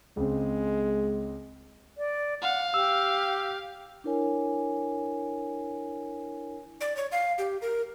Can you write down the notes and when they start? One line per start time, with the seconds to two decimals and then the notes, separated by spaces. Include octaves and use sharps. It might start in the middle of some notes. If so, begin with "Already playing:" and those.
0.17 C#2 G#3 C4
1.98 D5
2.42 F5 F#5
2.74 G4 E6
4.04 D4 E4 A#4 C#5 G#5
6.81 D5
6.96 C#5
7.12 F5
7.38 G4
7.62 A#4